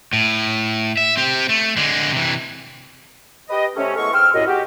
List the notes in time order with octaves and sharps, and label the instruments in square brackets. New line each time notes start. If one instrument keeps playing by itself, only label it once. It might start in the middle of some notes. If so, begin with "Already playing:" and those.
[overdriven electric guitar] A2
E5
C4 G4
A3
D3 G#3
C3 E3
[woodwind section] G4 B4 D#5
C3 A3 C#4
E3 G#3 A3 B3 A#4 C#6
G#2 G5 C6 E6 F6
C2 F#2 A2 D#5
G#3 F#4 G4